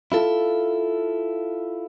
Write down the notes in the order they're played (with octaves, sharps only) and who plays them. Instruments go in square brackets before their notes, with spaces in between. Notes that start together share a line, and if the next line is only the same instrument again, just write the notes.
[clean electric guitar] E4 F4 A4